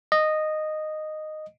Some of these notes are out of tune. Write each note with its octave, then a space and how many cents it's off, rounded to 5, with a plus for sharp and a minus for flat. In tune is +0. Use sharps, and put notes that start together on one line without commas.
D#5 -10